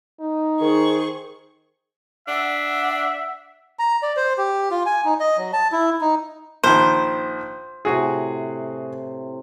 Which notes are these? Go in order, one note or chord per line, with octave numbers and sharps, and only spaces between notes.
D#4
D#3 G#4 C5 C#6
D4 E5 F#5
A#5
D5
C5
G4
F4
G#5
D#4
D#5
F#3
A5
E4
D#4
A#1 D#3 C5
A2 C3 F#4 G#4